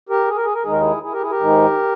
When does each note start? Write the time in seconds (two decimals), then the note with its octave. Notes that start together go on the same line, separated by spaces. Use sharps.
0.09 G4 A#4
0.28 G#4
0.37 A#4
0.45 G#4
0.54 A#4
0.63 D#2 D#3 G#3 D#4 G#4
0.72 A#4
0.80 E4 G#4
1.03 E4 G#4
1.12 G4 A#4
1.21 E4 G#4
1.30 G4 A#4
1.40 G#2 D#3 G#3 D#4